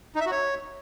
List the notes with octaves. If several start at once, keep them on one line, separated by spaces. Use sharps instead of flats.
D#4
E5
F#4
C#5